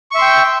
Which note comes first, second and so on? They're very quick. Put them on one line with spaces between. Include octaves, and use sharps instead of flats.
C#6 E5 C6 G5